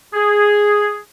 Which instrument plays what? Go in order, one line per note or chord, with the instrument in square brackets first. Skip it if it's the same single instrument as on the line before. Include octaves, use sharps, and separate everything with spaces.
[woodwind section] G#4